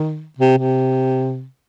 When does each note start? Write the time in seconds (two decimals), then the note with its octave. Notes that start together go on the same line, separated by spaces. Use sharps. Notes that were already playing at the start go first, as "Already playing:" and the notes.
Already playing: D#3
0.39 C3
0.57 C3